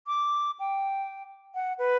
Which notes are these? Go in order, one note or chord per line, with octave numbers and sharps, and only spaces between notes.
D6
G5
F#5
B4